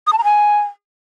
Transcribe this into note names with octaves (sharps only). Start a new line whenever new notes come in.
D#6
A5
A#5
G#5